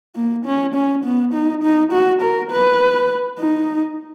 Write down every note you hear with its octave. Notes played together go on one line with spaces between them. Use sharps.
A#3
C#4
C#4
B3
D#4
D#4
F#4
A#4
B4
D#4